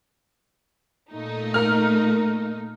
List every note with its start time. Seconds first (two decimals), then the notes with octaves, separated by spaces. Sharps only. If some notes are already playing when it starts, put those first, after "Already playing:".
1.12 A#2 A3 D#4
1.54 A#4 F6